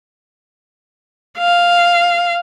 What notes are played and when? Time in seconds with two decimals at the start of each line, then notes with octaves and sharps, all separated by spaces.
1.38 F5